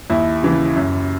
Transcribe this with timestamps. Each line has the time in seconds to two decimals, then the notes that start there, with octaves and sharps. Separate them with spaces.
0.10 D#2 E4
0.42 C#3 E3
0.75 F#2